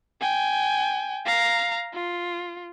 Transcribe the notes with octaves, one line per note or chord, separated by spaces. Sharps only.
G5 G#5
F5 A#5
F4